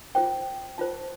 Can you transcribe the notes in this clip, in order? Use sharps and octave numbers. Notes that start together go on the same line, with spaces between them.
F4 C5 G5
F4 C5 A5